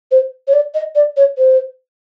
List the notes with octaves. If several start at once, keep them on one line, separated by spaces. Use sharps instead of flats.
C5
C#5
D5
D#5
D5
C#5
C5